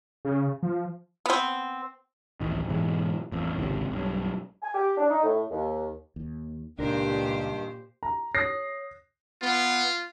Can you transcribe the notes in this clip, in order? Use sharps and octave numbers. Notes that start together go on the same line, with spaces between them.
C#3
F3
B3 C4
D1 A1 D#3
G#2 B2 E3 G#3
A1 F2
G#1 C#2 C3
B1 G2
G#5
G4
D4
D#4
A2
D#2
D#2
C#2 G2 A#2 D#3 D4 G4 A#4 C5
A#5
C#5 D#6 A#6 C7
B3 F4